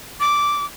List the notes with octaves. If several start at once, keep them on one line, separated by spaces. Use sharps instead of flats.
D6